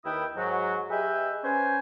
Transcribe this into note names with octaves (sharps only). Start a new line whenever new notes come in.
D#2 D#3 E4 B4 G5 D#6
G#2 F#3 F#4
G4 G#4 B4 D#5 E5 G5
C#4 B4 C5 G#5